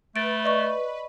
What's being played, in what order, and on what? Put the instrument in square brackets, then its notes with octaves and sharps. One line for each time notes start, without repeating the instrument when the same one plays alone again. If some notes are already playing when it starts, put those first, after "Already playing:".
[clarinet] A3 [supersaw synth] B4 [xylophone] A6 D7
[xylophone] D5 D#5 C#6